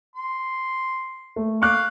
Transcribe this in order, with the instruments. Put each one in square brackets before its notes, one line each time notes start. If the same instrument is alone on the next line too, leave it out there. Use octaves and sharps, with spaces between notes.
[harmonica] C6
[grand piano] A3
[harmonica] F5 [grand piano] C#6 D6 F#6